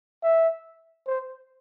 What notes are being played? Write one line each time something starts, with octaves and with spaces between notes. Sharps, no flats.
E5
C5